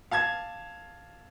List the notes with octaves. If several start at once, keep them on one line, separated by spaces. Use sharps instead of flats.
F5 A5 G#6